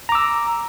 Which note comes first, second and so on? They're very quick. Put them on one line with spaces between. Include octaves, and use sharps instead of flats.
A#5 D6 E6